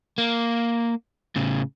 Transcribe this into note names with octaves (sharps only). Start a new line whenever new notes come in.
A#3
A2 C#3